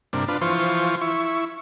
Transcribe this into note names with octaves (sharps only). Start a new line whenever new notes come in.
G2 C3 A#3 D4
D4 F4 B4
E3 F3 F4 C5 C#6
E4 C#6